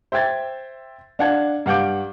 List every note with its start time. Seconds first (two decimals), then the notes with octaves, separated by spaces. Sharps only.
0.12 C5 E5 G5 G#6 A6
1.19 D4 F5 F#5 A5 G#6
1.66 G2 F5 F#5 D6 G6 D7